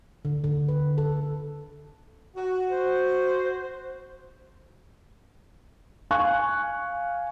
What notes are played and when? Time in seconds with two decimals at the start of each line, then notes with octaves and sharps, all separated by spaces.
0.25 D3
0.44 D3
0.68 B4
0.98 A4
2.35 F#4
2.68 C5
6.11 F5 G#5 C#6 F#6